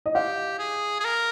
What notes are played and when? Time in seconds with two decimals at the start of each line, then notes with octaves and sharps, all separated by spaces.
0.06 D#5
0.15 G4 F5
0.59 G#4
1.00 G#4
1.04 A#4